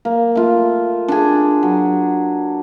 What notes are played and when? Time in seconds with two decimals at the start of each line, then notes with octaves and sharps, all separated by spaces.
0.05 A#3
0.35 A3 F4
1.08 D4 G#4
1.63 F#3